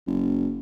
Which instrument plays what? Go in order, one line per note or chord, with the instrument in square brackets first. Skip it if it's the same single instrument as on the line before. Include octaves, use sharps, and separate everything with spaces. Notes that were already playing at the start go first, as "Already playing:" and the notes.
[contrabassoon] F#1